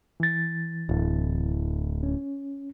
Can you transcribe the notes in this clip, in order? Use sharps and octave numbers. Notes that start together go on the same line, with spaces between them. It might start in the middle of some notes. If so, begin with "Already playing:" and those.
E3 A6
D1
C#4